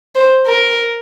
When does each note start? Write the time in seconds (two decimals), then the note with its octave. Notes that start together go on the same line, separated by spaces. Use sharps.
0.15 C5
0.47 A#4